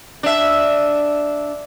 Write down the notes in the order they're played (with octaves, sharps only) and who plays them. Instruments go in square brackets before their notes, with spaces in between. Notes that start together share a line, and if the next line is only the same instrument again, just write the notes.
[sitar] D4 E5